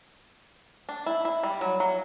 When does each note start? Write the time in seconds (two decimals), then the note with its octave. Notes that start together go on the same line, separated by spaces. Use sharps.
0.89 D4
1.06 E4
1.25 E4
1.43 G3
1.61 F#3
1.80 F#3